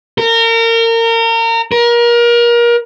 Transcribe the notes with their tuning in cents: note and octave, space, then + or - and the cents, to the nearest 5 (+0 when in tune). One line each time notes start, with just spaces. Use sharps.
A#4 -30
A#4 +30